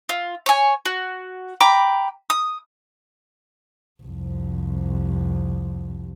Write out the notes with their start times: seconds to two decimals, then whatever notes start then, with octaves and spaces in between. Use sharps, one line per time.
0.09 F4
0.46 C#5 G#5
0.85 F#4
1.61 G5 A#5 B5 D6
2.30 D#6
4.02 C2 F2